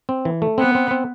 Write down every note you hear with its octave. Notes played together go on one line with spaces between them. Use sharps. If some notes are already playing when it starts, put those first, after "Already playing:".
C4
E3
A3
B3 C4
C4
C4